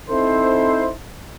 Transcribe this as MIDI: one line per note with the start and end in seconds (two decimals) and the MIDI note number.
0.10 0.91 60
0.10 0.91 63
0.10 0.91 64
0.10 0.91 69
0.10 0.91 72